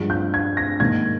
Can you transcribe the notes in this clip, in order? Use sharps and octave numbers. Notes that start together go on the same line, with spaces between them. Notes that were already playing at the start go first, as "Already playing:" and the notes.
Already playing: G2 F3 G#3
G6
G#6
A#6
G#2 D#3 A#3 G#6